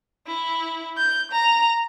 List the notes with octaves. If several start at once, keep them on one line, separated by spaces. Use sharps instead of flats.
E4
G6
A#5